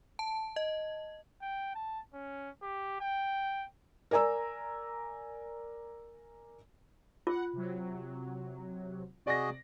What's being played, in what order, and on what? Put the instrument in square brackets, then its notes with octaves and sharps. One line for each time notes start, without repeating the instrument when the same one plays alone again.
[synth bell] A5
D#5
[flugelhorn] G5
A5
C#4
G4
G5
[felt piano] A#4 D5 G#5 A#5 E6
[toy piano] F4 [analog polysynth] F#5
[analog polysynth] C3 F#3
[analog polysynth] C3 [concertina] F#4 G#4 D#5 [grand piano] D5 A#6